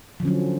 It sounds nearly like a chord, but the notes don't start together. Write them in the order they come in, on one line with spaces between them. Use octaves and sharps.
F3 D3 C#4 F#3